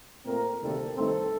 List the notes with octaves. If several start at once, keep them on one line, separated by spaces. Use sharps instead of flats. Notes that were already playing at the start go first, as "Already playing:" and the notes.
A#2 A3 C4 A#4
D2 C3 D#3 G3 A#3 A4
G2 D#3 A3 C4 A4